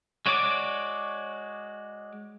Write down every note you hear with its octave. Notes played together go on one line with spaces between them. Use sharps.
G#3 F#4 C#5 D5 D6